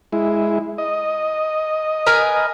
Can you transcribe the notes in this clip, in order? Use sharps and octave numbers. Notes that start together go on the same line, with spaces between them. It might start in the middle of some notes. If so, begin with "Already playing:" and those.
G#3 E4
D#5
A#4 B4 G#5